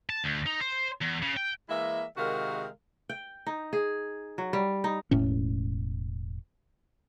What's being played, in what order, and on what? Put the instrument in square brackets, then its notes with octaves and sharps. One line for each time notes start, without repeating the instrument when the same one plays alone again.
[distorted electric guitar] A5
D2
D#4
C5
E2
C#3
G5
[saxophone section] E3 G#3 A#3 E4 E5
C3 D#3 G#3 F#4 A#4 F5
[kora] G5
D#4
G#4
F#3
G3
D#4
[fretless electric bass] E1 A2 C#4